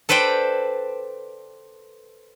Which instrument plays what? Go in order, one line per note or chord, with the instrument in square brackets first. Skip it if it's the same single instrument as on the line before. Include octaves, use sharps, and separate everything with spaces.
[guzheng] A4 B4 C5 D5 G5